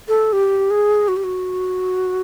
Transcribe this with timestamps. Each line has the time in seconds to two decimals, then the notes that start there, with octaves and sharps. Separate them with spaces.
0.08 A4
0.33 G4
0.71 G#4
1.08 F#4
1.16 G4
1.24 F#4